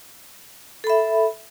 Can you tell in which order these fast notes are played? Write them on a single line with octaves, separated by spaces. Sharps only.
A4 B5 E5